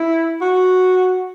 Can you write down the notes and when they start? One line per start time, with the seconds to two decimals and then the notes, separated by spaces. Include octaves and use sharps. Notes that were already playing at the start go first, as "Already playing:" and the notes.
Already playing: E4
0.42 F#4